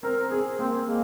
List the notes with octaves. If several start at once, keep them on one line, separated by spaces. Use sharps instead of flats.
C4 A#4
C4 G#4
A#3 C4
G#3 A#3